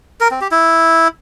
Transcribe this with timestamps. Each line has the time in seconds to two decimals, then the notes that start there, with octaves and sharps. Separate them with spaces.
0.21 A#4
0.31 C4
0.41 G4
0.52 E4